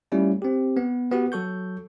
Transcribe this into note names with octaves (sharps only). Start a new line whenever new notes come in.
G3 A3 C#4 E4 F4
C4 G4
B3
B3 F#4 G4
F#3 A4 C#6 G6